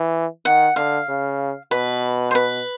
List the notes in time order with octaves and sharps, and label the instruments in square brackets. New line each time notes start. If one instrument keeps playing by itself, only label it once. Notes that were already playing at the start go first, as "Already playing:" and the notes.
Already playing: [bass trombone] E3
[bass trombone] D#3 [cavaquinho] F#5
[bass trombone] D3 [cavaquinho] F5
[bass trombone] C#3
[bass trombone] B2 [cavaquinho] B4
[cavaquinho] C5
B4